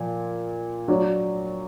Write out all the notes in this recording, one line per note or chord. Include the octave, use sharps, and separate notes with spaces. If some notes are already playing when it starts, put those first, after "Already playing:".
Already playing: A#2 F3
F#3 D4